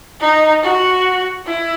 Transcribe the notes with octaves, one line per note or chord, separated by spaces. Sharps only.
D#4
F#4
E4